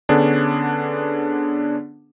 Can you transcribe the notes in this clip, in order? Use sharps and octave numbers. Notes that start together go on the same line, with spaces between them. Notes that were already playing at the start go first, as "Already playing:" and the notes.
D3 B3 C#4 D4 G#4